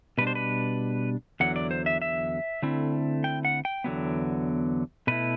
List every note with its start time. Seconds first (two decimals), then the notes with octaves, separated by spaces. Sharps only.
0.18 B2 G3 D4 B4
0.27 C5
0.35 B4
1.40 E2 D3 F#3 F#5
1.56 D5
1.71 C5
1.86 E5
2.02 E5
2.62 D3 A3 C4 E4
3.24 G5
3.45 F#5
3.65 G5
3.84 E2 D3 F#3 B3
5.07 B2 A3 E4 B4